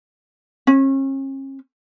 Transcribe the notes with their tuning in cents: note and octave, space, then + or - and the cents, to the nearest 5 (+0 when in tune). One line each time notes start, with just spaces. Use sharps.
C#4 -45